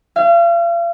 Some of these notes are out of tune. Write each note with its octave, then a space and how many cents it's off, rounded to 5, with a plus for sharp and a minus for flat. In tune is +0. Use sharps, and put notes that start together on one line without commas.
F5 -40